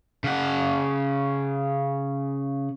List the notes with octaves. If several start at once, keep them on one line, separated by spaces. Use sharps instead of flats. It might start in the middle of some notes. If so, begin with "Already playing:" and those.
C#3 F#5